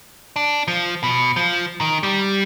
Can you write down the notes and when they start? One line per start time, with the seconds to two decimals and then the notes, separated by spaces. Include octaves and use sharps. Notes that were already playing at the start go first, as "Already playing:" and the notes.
0.36 D4
0.68 F3
1.04 B2
1.36 F3
1.81 D#3
2.03 G3